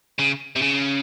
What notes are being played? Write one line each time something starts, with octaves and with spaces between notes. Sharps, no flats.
C#3
C3
C#3